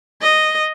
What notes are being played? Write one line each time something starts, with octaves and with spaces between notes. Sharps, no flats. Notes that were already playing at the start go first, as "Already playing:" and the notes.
D#5